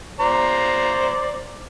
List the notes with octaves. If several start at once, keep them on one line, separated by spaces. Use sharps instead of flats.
C5 D5 A#5